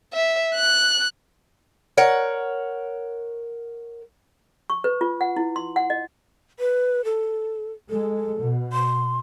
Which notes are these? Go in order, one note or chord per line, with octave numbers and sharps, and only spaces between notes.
E5
F#6
A#4 C#5 F#5
C#6
B4
F4
F#5
E4
C6
F#5
D#5
B4
A4
G#3 A4
B2
C6